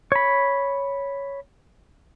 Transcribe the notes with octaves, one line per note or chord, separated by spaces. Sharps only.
C#5 B5